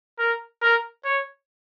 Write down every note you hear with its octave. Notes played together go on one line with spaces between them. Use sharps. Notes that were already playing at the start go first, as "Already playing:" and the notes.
A#4
A#4
C#5